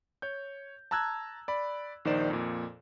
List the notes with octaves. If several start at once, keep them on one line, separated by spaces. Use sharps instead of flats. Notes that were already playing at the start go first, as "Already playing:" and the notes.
C#5 G6
A5 A#5 E6 F#6 G#6
D5 B5
A#1 D#3 D#4 C5 D5 E7
F2 A#2